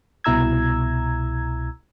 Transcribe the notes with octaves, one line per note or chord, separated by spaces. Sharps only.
C2 B2 E4 A#5 E6 G#6